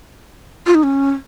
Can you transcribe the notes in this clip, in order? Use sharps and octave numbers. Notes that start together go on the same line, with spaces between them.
F4
D#4
C#4